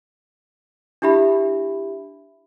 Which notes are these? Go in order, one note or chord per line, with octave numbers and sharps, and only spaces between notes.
D4 E4 G4 E5 B5